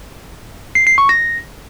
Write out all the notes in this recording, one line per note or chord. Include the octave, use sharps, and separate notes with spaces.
C7
C7
C#6
A#6